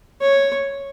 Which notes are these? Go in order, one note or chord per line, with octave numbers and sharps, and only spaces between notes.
C#5